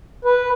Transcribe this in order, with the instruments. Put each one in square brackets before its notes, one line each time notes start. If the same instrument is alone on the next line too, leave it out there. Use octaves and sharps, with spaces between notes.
[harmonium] B4